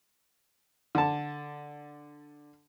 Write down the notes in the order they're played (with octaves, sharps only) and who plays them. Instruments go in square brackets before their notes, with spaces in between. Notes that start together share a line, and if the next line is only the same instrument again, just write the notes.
[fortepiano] D3 A5